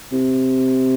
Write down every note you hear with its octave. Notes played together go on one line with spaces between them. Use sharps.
C3